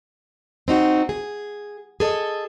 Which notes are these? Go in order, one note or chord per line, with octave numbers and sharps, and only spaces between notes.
C4 D#4 F#4
G#4
G#4 A4 D#5